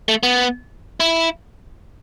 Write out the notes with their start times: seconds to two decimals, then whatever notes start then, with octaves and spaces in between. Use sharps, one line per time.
0.09 A3
0.23 B3
1.00 E4